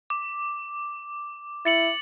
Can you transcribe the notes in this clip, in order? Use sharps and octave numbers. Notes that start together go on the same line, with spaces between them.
D6
E4 A6 C#7 F#7